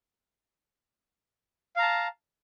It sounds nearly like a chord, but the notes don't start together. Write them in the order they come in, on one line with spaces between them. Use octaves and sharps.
F5 A#5 A5